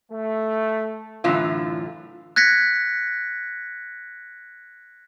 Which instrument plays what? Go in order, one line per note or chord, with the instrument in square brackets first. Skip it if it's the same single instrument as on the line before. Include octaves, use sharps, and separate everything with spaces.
[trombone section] A3
[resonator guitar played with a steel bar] F#2 A2 D3 E3 F4
[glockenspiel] F#6 G#6 A#6 B6 C#7